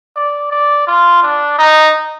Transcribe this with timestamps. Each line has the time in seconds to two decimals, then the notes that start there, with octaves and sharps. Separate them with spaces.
0.16 D5
0.51 D5
0.87 F4
1.23 D4
1.59 D#4